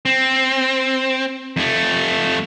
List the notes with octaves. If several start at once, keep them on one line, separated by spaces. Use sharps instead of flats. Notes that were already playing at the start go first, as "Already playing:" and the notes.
C4
F2 A3